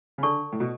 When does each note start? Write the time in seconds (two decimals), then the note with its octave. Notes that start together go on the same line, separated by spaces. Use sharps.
0.18 C#3
0.23 D3 A4 D5 A5 C#6
0.52 A2
0.60 B2